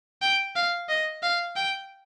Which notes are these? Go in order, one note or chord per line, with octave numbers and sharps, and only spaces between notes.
G5
F5
D#5
F5
G5